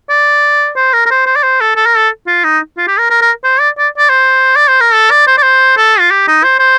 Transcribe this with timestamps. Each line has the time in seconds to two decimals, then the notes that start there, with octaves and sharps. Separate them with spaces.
0.10 D5
0.76 C5
0.93 A#4
1.06 A#4
1.11 C5
1.26 C5
1.36 D5
1.43 C5
1.61 A4
1.76 A4
1.86 A#4
1.97 A4
2.27 F4
2.44 D#4
2.77 F4
2.87 G4
2.99 A#4
3.10 A#4
3.22 A#4
3.44 C5
3.60 D5
3.78 D5
3.98 D5
4.10 C5
4.56 D5
4.68 C5
4.80 A#4
4.94 A4
5.11 D5
5.27 C5
5.37 D5
5.43 C5
5.77 A4
5.99 F4
6.11 G4
6.28 D#4
6.44 C5
6.60 C5